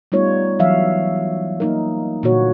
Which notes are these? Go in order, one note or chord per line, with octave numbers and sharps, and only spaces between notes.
G3 A3 B3 D#4 F4 C#5
E3 F#3 E5 F5
A#3 D#4 A#4
A#2 D3 A#3 F#4 C#5